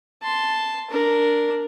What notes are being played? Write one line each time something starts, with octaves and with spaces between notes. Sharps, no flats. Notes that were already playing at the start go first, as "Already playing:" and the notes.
A5 C6
D4 A#4